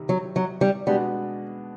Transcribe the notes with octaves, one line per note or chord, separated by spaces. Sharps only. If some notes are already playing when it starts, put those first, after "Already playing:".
Already playing: C3 D#3 G3
F#3
F#3
G3
B2 G3 G#3 B3 D4 F#4